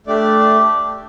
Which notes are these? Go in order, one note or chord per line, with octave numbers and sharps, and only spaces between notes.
A3 D4 G4 D5